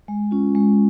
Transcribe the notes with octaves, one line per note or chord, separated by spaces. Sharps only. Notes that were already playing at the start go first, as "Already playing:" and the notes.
G#3
C#4 F4
G#3